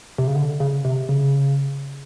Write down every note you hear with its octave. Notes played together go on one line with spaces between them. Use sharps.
C3
C#3
D3
C#3
C3
C#3